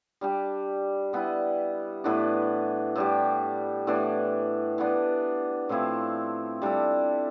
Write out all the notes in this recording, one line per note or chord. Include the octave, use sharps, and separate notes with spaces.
G3 D4 G4
G3 B3 E4
A2 E3 B3 D4
A2 G3 D4 G4
A2 E3 B3 D4
E3 B3 D4
A2 F3 C4 E4
G3 D4 A4